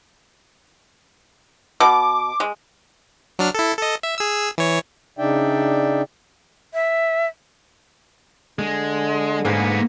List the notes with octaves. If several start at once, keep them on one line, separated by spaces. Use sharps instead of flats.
B2 D6
G#3
F#3 D4 F6
E4 A4
A4 D#5
E5
G#4 E6
E3 C#5
C#3 D4 D#4 D5 E5 G5
E5
D3 G#3
G#2 A#3 B3